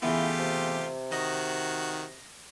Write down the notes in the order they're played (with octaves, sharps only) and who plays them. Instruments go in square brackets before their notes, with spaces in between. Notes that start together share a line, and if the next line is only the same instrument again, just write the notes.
[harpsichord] C#3 E3 B3 [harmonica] A3 F4 G4 [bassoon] E4
[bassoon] C3
[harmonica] D#3 F#4 [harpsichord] D#5